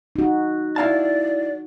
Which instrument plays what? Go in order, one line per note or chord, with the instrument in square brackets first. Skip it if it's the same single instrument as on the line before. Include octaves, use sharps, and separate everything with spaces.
[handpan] D#4 F#4
[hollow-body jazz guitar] E4 F5 A5 [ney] D5